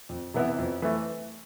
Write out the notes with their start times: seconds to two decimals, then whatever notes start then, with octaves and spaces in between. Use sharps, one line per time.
0.09 F2
0.34 C3 E3 B3 E4
0.58 F2
0.82 E3 A3